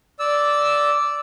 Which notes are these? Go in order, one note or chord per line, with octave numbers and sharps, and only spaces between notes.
D5 E6